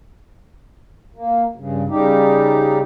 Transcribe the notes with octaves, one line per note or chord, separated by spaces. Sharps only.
A#3
G2 C#3
C#3 G3 D#4 G4